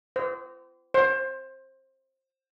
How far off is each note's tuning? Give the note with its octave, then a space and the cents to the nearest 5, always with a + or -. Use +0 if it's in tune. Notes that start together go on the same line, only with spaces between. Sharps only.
C5 -35
C5 +25